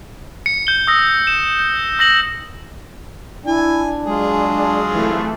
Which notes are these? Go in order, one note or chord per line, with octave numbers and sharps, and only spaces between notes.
C#7
G6 G7
D#6 E6 A#6
E7
G6
E6 A#6 F#7
D4 E4 G#5
F#3 G#3 F4 G#4
C2 E3 A3